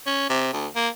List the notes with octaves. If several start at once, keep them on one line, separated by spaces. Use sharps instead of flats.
C#4
C3
D2
A#3